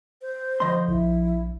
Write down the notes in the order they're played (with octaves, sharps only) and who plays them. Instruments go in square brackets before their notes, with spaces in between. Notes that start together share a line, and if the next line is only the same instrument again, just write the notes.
[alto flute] C5
[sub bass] D3 [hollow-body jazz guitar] F3 D#5 C6
[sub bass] A#1 [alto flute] E4